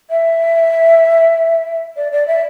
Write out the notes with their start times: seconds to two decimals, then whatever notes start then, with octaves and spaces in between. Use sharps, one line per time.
0.10 E5
1.96 D5
2.12 D5
2.27 E5